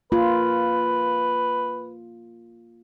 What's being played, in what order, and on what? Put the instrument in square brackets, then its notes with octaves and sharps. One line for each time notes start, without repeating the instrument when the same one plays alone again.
[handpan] A#3 F4 [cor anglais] B4